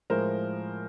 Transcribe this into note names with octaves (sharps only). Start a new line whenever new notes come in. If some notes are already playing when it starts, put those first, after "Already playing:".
A2 F3 G#3 A#4 C5